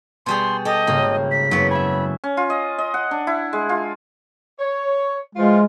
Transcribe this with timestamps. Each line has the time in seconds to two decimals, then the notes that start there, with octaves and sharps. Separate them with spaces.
0.26 B2 G3 G#4 C6
0.65 G4 A4 D#5
0.87 G#1 C#3 A#3
1.31 B6
1.51 F#1 F#3 B3
1.71 E5 G#5 B5
2.24 C#4
2.37 F4
2.50 D#5
2.78 D#5
2.94 F#5
3.11 D4
3.27 E4
3.53 G#3
3.69 F4
4.59 C#5
5.35 E3 F3 G#3 F4